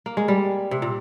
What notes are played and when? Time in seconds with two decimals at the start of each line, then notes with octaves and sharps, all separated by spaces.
0.06 A#3
0.17 G#3
0.28 G3
0.71 C3
0.82 A#2